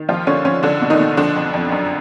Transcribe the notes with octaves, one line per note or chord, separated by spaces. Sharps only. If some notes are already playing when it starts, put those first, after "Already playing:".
Already playing: D#3
D#2 F3 F4
D3 C#4
F3 C#4
C#2 D3 D4
B2
D#3 D#4
B2
D3 F3 D4
F2
F2
F#2